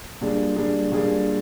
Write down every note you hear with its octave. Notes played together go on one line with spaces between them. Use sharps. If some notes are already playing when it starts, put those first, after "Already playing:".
A#2 G3 D4 G#4
A#2 G3 D4 G#4
A#2 G3 D4 G#4